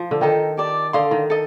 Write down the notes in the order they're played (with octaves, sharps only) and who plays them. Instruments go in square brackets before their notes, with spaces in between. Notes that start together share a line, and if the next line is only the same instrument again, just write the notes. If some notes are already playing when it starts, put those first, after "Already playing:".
Already playing: [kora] F3
D3
[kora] D#3 [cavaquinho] A4 D#5 G5 A#5
[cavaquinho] G4 D5 A5
[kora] D3 [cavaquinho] D5 F5 C6 D#6
[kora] D#3
[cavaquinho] A4 D#5